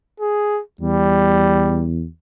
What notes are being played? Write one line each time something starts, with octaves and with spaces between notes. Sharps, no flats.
G#4
E2 G3